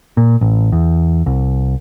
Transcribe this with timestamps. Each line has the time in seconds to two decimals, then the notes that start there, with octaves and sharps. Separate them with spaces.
0.17 A#2
0.41 A1
0.72 E2
1.26 C2